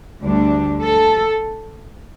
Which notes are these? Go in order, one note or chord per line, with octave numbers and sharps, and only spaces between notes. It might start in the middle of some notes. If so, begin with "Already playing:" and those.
D2 D3 G3 D4
A4